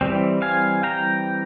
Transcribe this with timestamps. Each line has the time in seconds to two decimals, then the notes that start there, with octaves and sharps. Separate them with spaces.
0.01 E3 G3 C4
0.42 F5 G#5
0.83 G5 A#5